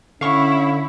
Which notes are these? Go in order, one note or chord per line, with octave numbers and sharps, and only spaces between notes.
D3 C#4 E4 F5 C#6